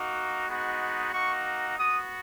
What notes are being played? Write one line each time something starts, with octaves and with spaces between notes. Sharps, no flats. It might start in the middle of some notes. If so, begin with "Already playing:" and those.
Already playing: A#3 D#4 F#4
G#3 B3 D#4 F#4
A#3 D#4 F#4 C#6
B3 F#4 D#6